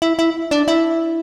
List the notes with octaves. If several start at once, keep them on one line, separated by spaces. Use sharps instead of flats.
E4
E4
D4
E4